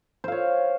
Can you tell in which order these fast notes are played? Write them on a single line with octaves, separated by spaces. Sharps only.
C5 F5 C#5